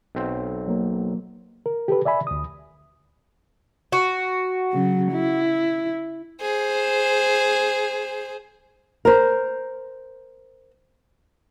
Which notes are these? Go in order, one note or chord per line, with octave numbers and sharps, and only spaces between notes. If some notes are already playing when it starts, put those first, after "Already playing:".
B1 C4
F#3 A#3
A#4
G4 A4 B4
D5 E5 G#5 B5
D2 D#6
F#4
C#3 F#3
E4
G#4 C5
A#4 C5